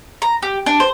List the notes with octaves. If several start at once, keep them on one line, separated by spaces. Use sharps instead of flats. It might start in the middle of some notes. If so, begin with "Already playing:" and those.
A#5
G4
D4
C5